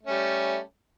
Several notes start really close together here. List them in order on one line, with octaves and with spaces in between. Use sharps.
A3 C#4 G3